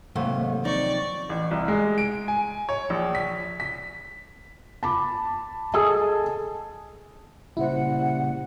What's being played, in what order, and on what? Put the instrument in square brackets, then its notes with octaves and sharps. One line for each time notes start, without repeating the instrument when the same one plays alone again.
[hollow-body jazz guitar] D#2 G#2 A3 [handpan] C3 D#3 F#3
[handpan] F3 C4 [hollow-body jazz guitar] D#4 [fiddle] D5 C#6
[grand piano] A1
C2
G#3
D7
G#5
C#5
A#1
B6
B6
[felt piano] A5 B5 D6
[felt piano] G#4 G#5 A5 [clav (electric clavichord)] A4 D#5
[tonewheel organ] A#2 C#3 G3 [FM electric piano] E4 C5 [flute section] F#5